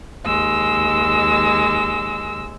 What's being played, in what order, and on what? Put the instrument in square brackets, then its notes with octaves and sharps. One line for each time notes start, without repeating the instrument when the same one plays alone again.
[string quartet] D#2 G#3 E6